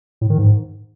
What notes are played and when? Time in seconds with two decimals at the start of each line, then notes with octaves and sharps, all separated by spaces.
0.21 A2
0.30 D#3
0.38 G#2